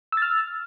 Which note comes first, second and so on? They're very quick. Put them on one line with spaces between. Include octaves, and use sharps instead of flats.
E6 A6 F6